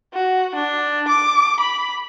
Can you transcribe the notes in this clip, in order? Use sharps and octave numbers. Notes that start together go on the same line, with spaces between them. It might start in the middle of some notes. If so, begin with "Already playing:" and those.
F#4
D4
D6
B5